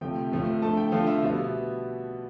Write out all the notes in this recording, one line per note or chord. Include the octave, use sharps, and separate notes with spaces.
C3 F3 A3 G5
A2 F3 A3
D3 A3 A5
G5
D3 F3 A3 F5
E5
B2 G3 B3 E5